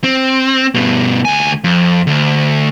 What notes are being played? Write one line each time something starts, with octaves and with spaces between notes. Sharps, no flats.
C4
G2 B2
D2 G#5
F2
D2